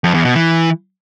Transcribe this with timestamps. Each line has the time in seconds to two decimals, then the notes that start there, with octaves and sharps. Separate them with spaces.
0.04 F2
0.14 E2
0.25 B2
0.35 E3